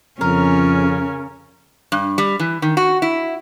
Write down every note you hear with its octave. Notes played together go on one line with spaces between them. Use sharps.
F2 C#3 C#4 A#4
G2
G3
E3
D#3
F#4
E4